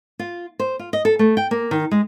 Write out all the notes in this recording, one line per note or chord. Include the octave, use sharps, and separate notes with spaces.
F4
C5
F4
D#5
A4
A3
G5
A#3
D#3
G#3